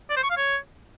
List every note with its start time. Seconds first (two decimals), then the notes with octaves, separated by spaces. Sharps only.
0.10 D5
0.16 C5
0.23 C#6
0.30 F5
0.37 C#5